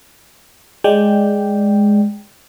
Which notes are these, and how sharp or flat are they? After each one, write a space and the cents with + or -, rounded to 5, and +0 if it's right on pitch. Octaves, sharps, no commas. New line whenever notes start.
G#3 +0 D5 +0 G5 +0